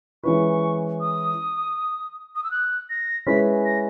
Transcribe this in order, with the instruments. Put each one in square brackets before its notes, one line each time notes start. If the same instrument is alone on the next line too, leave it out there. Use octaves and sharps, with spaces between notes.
[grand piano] E3 G#3 C#4 E4 B4 [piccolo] C#6
[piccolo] D#6
D#6
E6
F#6
A#6
[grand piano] G#3 C#4 E4 B4 [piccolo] B6
[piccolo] A#6